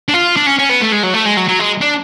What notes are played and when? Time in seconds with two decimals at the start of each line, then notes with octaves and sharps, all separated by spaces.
0.09 D4
0.14 F4
0.36 D4
0.47 C#4
0.59 C#4
0.69 B3
0.81 A3
0.92 G#3
1.03 F#3
1.14 A3
1.25 G#3
1.37 F#3
1.48 F#3
1.59 G#3
1.81 D4